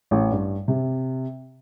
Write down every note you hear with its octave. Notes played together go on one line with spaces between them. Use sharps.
A1
G2
C3